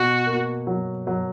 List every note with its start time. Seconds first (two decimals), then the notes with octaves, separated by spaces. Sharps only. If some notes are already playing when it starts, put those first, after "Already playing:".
Already playing: B2 F#4
0.26 A#3
0.67 F#3
1.07 F#3